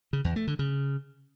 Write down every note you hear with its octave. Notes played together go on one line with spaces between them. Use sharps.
C#3
E2
A3
D3
C#3